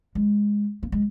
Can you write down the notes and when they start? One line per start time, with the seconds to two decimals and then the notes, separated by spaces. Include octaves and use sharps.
0.15 G#3
0.83 A#3
0.92 G#3